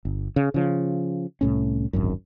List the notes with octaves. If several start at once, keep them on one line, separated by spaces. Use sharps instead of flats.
G1
C#3
C#3 F3
C2 A2 C#4
D1 G#1 F#2